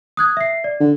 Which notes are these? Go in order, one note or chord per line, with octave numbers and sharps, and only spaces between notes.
D#6 F#6 G#6
E5 C7
D5
D3